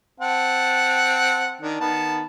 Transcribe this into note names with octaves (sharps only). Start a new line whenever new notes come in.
C4 F#5 A5
D#3 D4
D#3 B3 A5